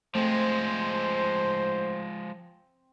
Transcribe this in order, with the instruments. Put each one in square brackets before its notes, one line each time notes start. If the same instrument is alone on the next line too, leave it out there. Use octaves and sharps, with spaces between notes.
[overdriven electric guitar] F3 G#3 [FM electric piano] A3 [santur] C4 [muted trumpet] C5